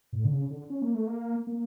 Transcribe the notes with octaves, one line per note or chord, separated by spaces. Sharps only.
A2
D3
C#3
D3
C#4
A#3
A3
A#3
A#3